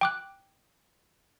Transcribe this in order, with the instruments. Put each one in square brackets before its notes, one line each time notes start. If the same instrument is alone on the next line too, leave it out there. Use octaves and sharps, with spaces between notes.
[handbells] G5 D6 F#6